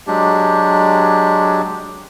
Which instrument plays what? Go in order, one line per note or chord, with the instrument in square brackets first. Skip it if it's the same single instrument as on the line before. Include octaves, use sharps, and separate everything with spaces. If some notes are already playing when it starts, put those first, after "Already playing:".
[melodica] F#3 G#3 D4 G4